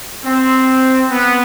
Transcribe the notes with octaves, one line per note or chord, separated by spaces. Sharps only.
C4
B3